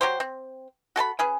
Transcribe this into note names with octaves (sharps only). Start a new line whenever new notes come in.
F#3 G4 C5
C4
F#4 A4 A5 B5
C#4 G#4 B4